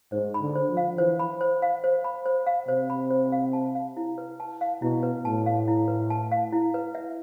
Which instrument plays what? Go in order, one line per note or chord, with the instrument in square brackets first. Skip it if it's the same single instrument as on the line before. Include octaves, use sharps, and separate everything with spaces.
[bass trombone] G#2 [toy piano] C5
[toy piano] B5
[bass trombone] D3
[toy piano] C5
[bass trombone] F3
[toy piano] F5
[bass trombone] E3 [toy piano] C5
[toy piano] B5
C5
F5
C5
B5
C5
F5
[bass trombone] C3 [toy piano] C5
[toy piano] B5
C5
F5
A5
F5
E4
B4
A5
F5
[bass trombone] B2 [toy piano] E4
[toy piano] B4
[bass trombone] A2 [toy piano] A5
[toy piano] F5
E4
B4
A5
F5
E4
B4
E5